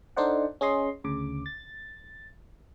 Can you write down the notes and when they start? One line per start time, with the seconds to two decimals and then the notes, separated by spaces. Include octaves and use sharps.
0.17 D4 D#4 A4 C5 D5 F#5
0.61 C#4 G#4 D#5 C6
1.04 D2 C#3 D6
1.46 A6